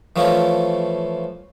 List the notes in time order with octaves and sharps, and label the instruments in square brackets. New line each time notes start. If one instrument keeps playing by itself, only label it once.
[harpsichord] E3 F3 A3 C#4 E4 F4